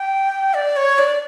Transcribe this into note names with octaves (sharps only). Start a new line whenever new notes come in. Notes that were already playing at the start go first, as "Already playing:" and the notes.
Already playing: G5
D5
C#5
D5